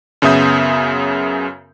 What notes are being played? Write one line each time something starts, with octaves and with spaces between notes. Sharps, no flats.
F#2 C#3 B3 E5 D#6 G6